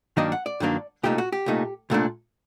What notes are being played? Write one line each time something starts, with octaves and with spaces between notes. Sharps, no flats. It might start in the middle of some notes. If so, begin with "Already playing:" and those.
G2 D#3 F#3 A#3 D4 D#5
F#5
D5
G2 D#3 F#3 A#3 D4
C2 A#2 A3 D#4 G4
F#4
G4
C2 A#2 A3 D#4
C2 A#2 A3 D4